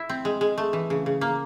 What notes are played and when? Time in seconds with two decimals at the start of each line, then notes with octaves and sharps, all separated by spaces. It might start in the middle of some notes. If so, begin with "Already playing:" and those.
Already playing: E4
0.09 C4
0.25 G#3
0.41 G#3
0.58 A3
0.73 E3
0.90 C#3
1.06 C#3
1.21 A#3